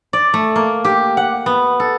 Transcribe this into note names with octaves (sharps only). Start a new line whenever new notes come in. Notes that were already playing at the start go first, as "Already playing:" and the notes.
D5
A3
A#3
G4
F#5
B3
A4